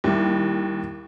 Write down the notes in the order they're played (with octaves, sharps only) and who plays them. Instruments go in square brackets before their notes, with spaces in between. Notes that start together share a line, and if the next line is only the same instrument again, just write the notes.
[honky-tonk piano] D#2 [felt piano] G3 E4 G4